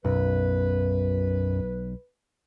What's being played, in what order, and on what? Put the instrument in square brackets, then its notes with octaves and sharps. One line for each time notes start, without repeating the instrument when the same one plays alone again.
[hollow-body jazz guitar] B1 [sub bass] F#2 [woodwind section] B4